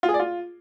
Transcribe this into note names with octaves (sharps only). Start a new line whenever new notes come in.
F4
G#4
D5
F4